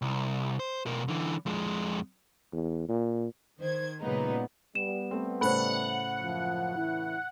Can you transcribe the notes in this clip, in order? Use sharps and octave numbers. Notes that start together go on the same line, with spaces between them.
C2
C5
B2 A#4
D3 E3
F2 G#3
E2
A#2
D#3 C5 G#6
A#2 C#3 F#3 G#3 B3 D#4
G3 B3 E7
A3 C4
A2 C#3 A3 C5 F#5 B5
F#2 F3
E3 E4